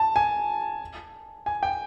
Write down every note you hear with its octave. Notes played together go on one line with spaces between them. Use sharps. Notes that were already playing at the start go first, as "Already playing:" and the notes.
Already playing: A5
G#5
G#5
G5